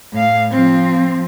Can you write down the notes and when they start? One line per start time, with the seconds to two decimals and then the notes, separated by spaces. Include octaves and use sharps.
0.13 A2 F5
0.50 F3 C4